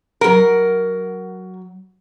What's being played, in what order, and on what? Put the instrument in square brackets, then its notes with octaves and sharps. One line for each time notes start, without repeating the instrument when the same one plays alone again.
[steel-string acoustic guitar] F#3 F#5 [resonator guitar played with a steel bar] A#4